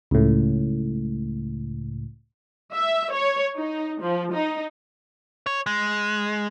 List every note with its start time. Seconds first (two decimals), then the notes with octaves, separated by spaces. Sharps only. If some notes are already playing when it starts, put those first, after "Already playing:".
0.11 C#2 A2
2.74 E5
3.13 C#5
3.57 D#4
4.02 F3
4.33 D#4
5.46 C#5
5.66 G#3